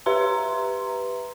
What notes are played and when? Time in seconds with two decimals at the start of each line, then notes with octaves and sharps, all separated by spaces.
0.06 G4 B4 E5 A#5 C6